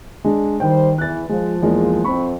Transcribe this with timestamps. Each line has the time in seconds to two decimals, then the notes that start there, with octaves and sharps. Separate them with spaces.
0.24 G#3 D4
0.60 D#3 G3 C5 G5
0.98 E2 E3 F#6 A6
1.29 F3 G#3
1.62 E2 G#3 A#3
2.04 F2 C4 B5 C#6